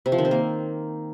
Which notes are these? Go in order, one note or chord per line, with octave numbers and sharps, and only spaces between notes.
C3
F3
D#3
C4
A#3